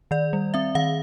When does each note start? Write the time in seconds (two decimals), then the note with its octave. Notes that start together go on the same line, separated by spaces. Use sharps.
0.11 D#3 D5
0.33 G3
0.54 C4 E5
0.75 D#3 F5